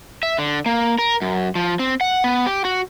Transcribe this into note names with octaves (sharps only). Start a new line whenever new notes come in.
E5
D3
A#3
A#4
F#2
F3
C4
F#5
B3
G4
F#4